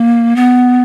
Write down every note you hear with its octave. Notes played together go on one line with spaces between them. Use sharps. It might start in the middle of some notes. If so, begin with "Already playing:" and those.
Already playing: A#3
B3